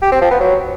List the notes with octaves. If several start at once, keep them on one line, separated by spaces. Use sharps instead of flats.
G4
C4
F3
B3
F#3